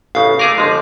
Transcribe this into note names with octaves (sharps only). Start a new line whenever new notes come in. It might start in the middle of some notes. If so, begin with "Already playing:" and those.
A1 C#3 F5
A3 G#4 A#4 D6
G1 F3 G#3